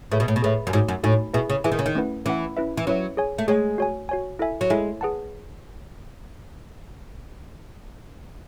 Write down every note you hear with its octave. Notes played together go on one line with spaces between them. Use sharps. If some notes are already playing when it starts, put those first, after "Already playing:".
A2 G#4 B4 E5
B2
A2
B2
A2 G#4 B4 E5
F#2
G#2 A3 D#4 F#4 C#5 G#5
F#2
A2 A3 D#4 F#4 C#5 G#5
B2 E4 G#4 B4 E5 G#5
C#3
E3 E4 G#4 B4 E5 G#5
D#3
C#3
D#3
A3 C#4 E4 B4 F#5
E3 A3 C#4 E4 B4 F#5
C#4 E4 B4 E5
E3
F#3 C#4 E4 B4 E5
G#4 C#5 G#5
A3
G#3 G#4 C#5 G#5
F#4 C#5 G#5
F#4 C#5 G#5
E4 A4 E5 G#5
F#3
G#3 E4 A4 E5 G#5
G#4 B4 F#5 A5